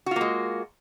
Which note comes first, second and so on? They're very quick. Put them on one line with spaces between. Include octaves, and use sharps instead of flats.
F#4 F4 A#3 G#3